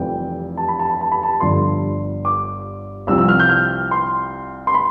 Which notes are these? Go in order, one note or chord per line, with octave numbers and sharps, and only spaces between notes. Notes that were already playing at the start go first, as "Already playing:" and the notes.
Already playing: F1 F2 E3 G3 G5
A5
B5
A5
B5
A5
B5
A5
G1 G2 D3 F3 C6
D6
C2 C3 F3 E6
E6
F6
G6
F6
C6
C6
B5